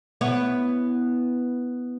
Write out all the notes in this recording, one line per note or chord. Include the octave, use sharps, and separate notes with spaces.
B3 E4 C#5